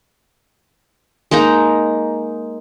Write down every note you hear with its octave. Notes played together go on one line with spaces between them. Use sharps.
G#3 A#3 D#4 A#5